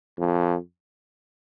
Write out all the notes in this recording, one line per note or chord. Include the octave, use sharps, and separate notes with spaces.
F2